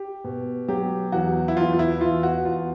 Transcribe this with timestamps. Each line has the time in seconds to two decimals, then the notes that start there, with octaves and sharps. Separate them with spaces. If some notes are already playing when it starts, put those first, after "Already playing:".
Already playing: G4
0.24 B2
0.68 F#3 G4
1.12 E2 F#4
1.48 E4
1.57 E2 F4
1.73 F4
1.79 E4
2.01 E2 F4
2.23 F#4
2.45 E2 F4